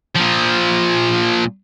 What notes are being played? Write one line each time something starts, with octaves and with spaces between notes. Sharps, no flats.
A#2 F3